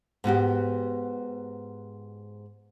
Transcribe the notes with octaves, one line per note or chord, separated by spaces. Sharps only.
G#2 B3 F#4 G4